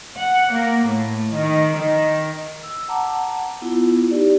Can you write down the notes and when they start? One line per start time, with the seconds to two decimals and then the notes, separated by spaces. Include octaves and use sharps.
0.18 F#5
0.53 A#3
0.87 A2
1.35 D#3
1.78 D#3
2.63 E6
2.88 F#5 A5 A#5 D6
3.62 B3 E4 F4
4.10 D#4 G4 D5